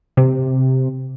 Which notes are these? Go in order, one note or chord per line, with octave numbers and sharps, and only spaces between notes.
C3